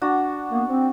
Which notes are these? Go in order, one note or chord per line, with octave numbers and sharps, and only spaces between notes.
D4 F#4
A#3 B3
C4